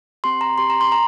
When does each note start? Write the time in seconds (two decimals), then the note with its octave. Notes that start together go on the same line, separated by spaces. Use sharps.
0.24 C4 G4 C6
0.41 A#5
0.58 C4 G4 C6
0.70 A#5
0.81 C6
0.92 A#5